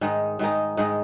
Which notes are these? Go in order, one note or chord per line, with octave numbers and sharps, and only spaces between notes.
G#2 D#3 G#3 D#4
G#2 D#3 G#3 D#4
G#2 D#3 G#3 D#4